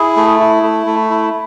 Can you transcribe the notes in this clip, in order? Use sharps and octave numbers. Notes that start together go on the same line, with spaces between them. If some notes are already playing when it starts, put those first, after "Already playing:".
Already playing: E4 G#4
A3
E4
A3
A3
E4